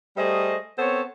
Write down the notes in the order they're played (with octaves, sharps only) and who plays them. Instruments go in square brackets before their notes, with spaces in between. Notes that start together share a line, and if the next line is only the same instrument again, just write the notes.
[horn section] G3 A3 G#4 C5 D#5
B3 C4 A4 C5 C#5